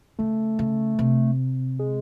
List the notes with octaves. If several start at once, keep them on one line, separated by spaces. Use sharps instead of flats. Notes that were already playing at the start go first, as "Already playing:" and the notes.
C#3 A3
C#3
C3
G#3